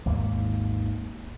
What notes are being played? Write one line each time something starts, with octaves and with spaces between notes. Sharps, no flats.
G#1 D#2 G#2 A#3